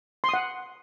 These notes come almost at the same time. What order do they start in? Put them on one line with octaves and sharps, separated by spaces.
C6 D#6 F#5